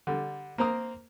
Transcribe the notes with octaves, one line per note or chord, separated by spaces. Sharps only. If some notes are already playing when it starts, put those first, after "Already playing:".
D3 G3
A#3 C4 A#5 D#6